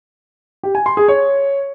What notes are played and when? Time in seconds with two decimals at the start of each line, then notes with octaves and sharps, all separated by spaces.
0.63 G4
0.75 G#5
0.86 C6
0.97 G#4
1.08 C#5